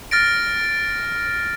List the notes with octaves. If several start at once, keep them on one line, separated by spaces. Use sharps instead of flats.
F6 A6 A#6 D7